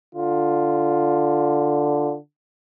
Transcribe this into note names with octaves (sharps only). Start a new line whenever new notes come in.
D3 F4